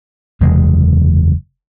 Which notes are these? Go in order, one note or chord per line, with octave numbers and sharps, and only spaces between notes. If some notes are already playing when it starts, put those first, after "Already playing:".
F#1 E2 C3 G#3